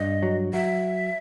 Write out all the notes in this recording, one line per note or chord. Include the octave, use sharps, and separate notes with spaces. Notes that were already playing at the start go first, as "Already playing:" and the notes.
Already playing: G2 D#5
F#3
F#3 E5